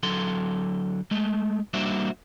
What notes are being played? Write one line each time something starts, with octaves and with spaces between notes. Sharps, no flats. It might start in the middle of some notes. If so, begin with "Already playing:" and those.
D3 F#3 A4 C6
G#3 A3
G3 A#3 D4 F#4 C5 E5